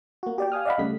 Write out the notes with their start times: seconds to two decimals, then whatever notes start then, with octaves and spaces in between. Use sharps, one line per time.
0.23 A#3 F#4
0.38 G4 D5 G5
0.52 F5 G#5 D#6 F6
0.65 D5 D#5 F5 F#5 B5
0.78 C#2 C#3 G3 A3 B6